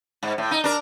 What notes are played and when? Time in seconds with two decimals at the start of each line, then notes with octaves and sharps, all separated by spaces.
0.23 G#2
0.38 A2
0.51 D#4
0.64 D4 A#4